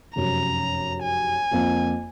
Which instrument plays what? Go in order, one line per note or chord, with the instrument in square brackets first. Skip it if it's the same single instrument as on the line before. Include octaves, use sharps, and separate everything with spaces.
[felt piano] F1 F#2 [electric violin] A#5
[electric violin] G#5
[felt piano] F2 F3 A#3